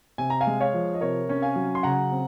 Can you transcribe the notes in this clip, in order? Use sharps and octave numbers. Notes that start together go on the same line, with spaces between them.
C3 G#5
A#5
F5 G#5
G#3
C#5 F5
F3
D#5
C3 A#4 C#5
C#4
F5 G#5
F#3
C6
C#3 F#5 A#5
C4